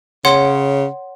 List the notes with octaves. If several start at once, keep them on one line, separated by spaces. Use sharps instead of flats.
C#3 C#5 F#5 C6